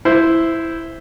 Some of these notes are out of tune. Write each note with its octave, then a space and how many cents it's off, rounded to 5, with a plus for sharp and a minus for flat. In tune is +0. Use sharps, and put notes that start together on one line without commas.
E4 +0 C5 -5